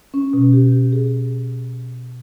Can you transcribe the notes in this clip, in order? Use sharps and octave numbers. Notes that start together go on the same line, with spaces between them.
C#4
B2
G4
G4
G#4